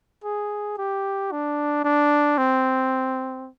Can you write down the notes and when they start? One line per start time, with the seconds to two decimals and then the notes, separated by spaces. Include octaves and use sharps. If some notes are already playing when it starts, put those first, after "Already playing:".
0.24 G#4
0.78 G4
1.32 D4
1.84 D4
2.38 C4